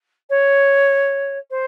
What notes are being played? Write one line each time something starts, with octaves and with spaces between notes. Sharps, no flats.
C#5
C5